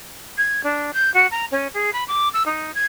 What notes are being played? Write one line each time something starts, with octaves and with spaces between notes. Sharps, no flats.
G#6
D4
G6
F#4
A#5
C#4
G#4
B5
D6
E6
D#4
G#6